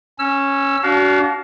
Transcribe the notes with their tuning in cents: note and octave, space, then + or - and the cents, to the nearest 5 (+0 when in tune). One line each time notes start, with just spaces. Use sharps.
C#4 -5 E6 +20
D4 -40 F#4 +20 F5 +0